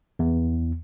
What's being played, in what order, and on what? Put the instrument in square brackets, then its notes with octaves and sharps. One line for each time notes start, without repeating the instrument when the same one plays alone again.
[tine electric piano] E2